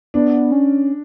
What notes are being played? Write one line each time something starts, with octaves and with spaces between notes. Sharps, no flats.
B3 D4
C#4